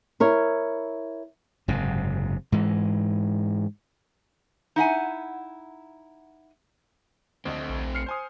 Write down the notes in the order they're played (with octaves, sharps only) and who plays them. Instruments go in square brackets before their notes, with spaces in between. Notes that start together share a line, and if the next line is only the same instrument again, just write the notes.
[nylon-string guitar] E4 A#4 C#5
[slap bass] F#1 G#2 C3
G#2 E3 G#3
[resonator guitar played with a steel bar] D#4 E4 F#5 G#5
[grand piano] D2 D#5 [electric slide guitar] A3 C4
[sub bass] A#1
[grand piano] F6 C7 C#7
C5 G#5 D#6